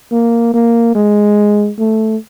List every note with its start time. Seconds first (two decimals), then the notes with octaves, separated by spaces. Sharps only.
0.11 A#3
0.54 A#3
0.95 G#3
1.79 A3